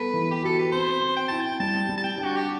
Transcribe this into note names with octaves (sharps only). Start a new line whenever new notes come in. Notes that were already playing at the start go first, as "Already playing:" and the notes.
Already playing: G3 B3 A4 B4
E3
G4
F#4 A4
B4
C4 C5
C4
G5
E4 A5
G5
G3 A5
G3
A5
G5
D4
F#4
G4